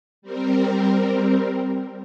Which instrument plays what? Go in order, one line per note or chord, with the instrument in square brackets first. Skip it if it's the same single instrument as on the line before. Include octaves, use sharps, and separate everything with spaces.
[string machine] G3 C4 A#4